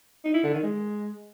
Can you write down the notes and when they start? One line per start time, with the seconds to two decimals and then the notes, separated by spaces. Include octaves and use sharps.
0.24 D#4
0.34 E4
0.44 D3
0.53 D#3
0.63 G#3